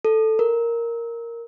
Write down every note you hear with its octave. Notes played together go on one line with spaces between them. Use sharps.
A4
A#4